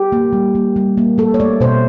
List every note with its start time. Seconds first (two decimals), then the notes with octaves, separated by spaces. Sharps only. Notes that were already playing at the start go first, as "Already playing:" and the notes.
Already playing: G4
0.12 A#3
0.33 G3
0.55 A#3
0.76 G3
0.97 A#3
1.18 A3 A4
1.34 C#5
1.40 A3 D5
1.61 B2 C5